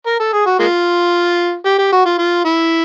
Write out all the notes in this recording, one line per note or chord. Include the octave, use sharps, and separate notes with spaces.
A#4
A4
G#4
F#4
G#3 A#3 F4
G4
G4
F#4
F4
F4
E4